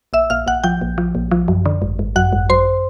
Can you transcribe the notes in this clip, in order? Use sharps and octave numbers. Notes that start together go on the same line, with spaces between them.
A#1 E5 E6
A#1 F5 F6
A#1 F#5 F#6
F3 G5 G6
A#1
F3
A#1
F3
F#2
D3
G#1
G#1
F#2 F#5 F#6
G#1
F#2 C5 C6